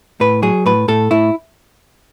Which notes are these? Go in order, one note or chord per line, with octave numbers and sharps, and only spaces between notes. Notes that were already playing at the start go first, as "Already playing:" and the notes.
A2 B4
F#3 G#4
A2 B4
A2 A4
A2 E4